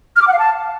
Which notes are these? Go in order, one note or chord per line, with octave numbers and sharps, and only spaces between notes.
F6
D6
F#5
F5
A5